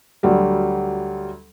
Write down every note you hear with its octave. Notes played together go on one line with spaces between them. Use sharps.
D2 F#3 G3